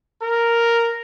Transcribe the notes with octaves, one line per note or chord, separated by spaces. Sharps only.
A#4